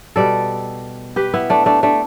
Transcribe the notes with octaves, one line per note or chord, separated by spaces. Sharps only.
B2 G3 A4 D5
G4 B4
B3 E4
A3 D4
A3 D4
A3 D4